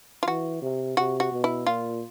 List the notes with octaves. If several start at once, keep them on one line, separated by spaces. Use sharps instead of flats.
F4
E3 F#4
C3
C3 F#4
F#4
B2
E4
A#2 F4